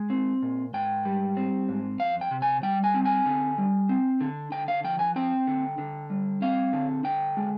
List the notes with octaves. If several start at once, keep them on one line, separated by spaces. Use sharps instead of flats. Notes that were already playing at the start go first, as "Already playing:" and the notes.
Already playing: G#3
C4
A#2
G#2 G5
G3
C4
G#2
F2 F5
G5
C3
G#5
G3 G5
G#5
C4
G#5
D3
G3
C4
D3
D3 G5
F5
F3 G5
G#5
C4 G5
D3
D3
G3
C4 F5
D3
D3 G5
G#3